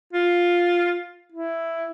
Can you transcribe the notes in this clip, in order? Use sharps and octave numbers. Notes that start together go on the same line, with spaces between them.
F4
E4